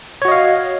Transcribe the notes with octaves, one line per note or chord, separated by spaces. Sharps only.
F#4 C#5 D#5 F5